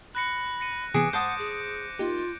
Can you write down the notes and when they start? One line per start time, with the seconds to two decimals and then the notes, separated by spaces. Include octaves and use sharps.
0.15 B5 F#6 A#6 C#7
0.60 A#6 C#7 D#7
0.94 C3 E3 B3 G#4 D6 C#7 D7
1.13 G#2 C5 F#5 A5 D#6 G6
1.38 G#4
1.99 A#3 D#4 F4 G4